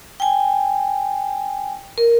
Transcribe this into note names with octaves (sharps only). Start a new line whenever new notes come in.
G5 G#5
A#4